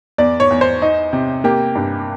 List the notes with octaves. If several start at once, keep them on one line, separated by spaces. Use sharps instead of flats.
E2 D5
C#5
E2
C5
D#4
C3
A#3 G4
G2